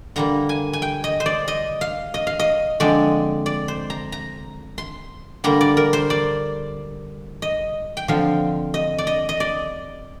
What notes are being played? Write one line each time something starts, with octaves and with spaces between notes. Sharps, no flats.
D3 G3 A#3 A#5
G#5
G#5
G5
D#5
C5
D5
D#5
F5
D#5
F5
D#5
D3 F3 G#3 C4 D5
D5
C5
A#5
A#5
C6
D3 G3 A#3 A#5
D5
A#4
C5
D5
D#5
G5
D3 F3 C4 F5
D#5
D5
D#5
D#5
D5